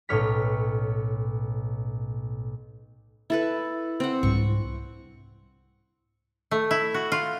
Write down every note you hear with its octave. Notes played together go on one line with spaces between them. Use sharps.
B1 A2 C#4 C#5 F6 B6
E4 A4 B4
C4 F#5
C2 G#2 G3 C#6
A3
E4
F#4
F4